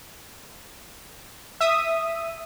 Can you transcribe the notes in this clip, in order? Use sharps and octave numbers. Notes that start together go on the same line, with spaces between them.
E5 D#6